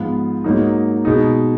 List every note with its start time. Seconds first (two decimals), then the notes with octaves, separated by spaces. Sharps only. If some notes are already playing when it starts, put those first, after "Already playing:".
Already playing: G#2 F3 B3 F4
0.44 G#2 F#3 A#3 D#4
1.05 B2 G#3 D#4